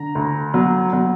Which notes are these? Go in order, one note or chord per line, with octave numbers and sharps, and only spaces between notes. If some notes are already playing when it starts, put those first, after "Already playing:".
Already playing: D3 A#5
D2
F#3
F#3